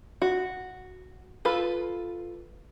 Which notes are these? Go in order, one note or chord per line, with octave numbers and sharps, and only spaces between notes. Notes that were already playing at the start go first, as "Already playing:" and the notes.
F#4
F4 A4 B4